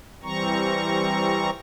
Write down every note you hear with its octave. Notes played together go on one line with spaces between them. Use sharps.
E3 G3 C4 A#5 C#6